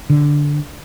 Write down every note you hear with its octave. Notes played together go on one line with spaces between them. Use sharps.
D3